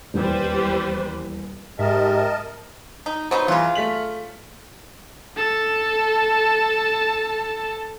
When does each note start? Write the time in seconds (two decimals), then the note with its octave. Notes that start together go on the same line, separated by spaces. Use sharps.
0.14 D#1 E2 G3 B4 C5
1.79 G#2 G4 A#4 D#5 E5 A5
3.06 D#4
3.31 F#3 B3 D#4 C5
3.48 C#3 E3 F4
3.75 A3 B6 F#7
5.37 A4 A5